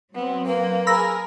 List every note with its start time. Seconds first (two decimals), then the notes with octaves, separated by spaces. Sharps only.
0.15 F#3 B3 C4
0.47 A#3 B4
0.87 G#4 A#4 B5 E6 A#6